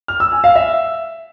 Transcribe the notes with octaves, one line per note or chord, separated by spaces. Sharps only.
F6
E6
G#5
F5
E5